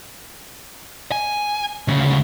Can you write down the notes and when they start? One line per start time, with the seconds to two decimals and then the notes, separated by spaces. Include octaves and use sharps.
1.12 G#5
1.88 D2 C#3